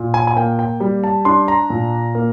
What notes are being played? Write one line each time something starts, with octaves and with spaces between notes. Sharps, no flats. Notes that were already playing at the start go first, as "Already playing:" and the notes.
Already playing: A#2
G#5
G#5
A#3 G5
G5
G3
A5
D4 C6
A#5
A#2
A#3